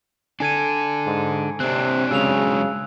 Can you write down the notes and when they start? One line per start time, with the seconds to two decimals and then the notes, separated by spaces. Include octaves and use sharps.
0.40 D4 A4 G#5 G#6 D#7
1.06 G#2
1.60 C3 C4 D4 F#6
2.11 C#3 F#3 G#3 D4 E6 F7